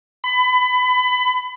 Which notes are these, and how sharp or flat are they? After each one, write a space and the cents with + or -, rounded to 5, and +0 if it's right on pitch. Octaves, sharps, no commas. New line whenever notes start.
B5 +25